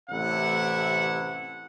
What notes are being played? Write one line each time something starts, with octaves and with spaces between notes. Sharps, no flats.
A1 C3 A3 E4 F#5